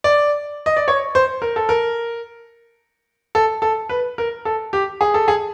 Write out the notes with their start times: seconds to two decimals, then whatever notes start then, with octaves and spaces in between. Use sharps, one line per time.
0.04 D5
0.66 D#5
0.77 D5
0.88 C#5
1.15 C5
1.42 A#4
1.56 A4
1.69 A#4
3.35 A4
3.62 A4
3.89 B4
4.18 A#4
4.45 A4
4.73 G4
5.01 G#4
5.14 A4
5.28 G#4